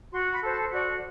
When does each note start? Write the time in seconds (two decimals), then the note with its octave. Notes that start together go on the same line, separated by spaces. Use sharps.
0.11 F#4 C6
0.32 B5
0.42 A4 C5
0.52 A5
0.72 F#4 D5